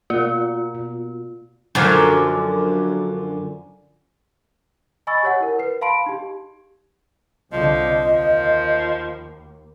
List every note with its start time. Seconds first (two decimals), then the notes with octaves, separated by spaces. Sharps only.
0.10 B2 A#3 F4 F#5
0.75 B2
1.75 F#2 D3 F3
5.07 D#5 G#5 B5 C#6 E6 A6
5.23 G4 C#5 F#5
5.40 E4 A#4
5.59 B4 C7
5.81 F5 A5 B5 C6 D7
6.06 D#4 G4
7.52 C2 D3 F3 D#5
8.05 D#2 F3